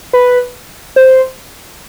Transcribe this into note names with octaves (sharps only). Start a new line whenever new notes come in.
B4
C5